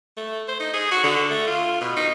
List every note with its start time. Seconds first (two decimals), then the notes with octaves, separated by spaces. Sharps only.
0.17 A3
0.48 C5
0.60 D#4
0.73 G#4
0.91 F#4
1.04 D3
1.30 A3
1.47 F4
1.81 B2
1.96 D#4